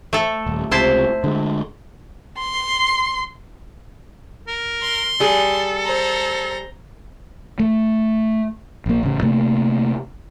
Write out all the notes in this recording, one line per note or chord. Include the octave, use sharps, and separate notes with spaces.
A3 A4
D#1
C#2 C3 E4 C5 A5
D3 G#3
C6
A#4
C6
G3 G#4 A4
C5 A#5
A3
A#1 A#3
A1 C#3
C3 A3 A#3